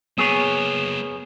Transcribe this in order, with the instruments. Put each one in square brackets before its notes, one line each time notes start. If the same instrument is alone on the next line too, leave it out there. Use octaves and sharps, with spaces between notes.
[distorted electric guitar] F#3 A#3 [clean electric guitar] B3 G#4 C#5